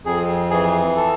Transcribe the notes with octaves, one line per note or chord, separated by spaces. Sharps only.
F2 G#4
E3 G#4
A4